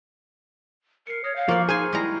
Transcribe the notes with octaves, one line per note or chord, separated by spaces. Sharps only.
A#4 C7 C#7
C#5 D#6 F6 A#6
F5 F#6 G6
F3 A#3 D5 C#6 F6
D#4 G#4 C5 G#5
G3 G#3 E4 A#5